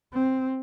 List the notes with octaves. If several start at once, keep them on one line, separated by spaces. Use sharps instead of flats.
C4